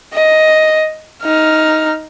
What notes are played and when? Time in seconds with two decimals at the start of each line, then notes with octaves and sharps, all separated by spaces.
0.13 D#5
1.23 D#4 F6